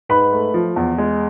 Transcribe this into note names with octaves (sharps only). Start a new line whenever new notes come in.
G#2 B4 B5
A3
F3
E2
G#3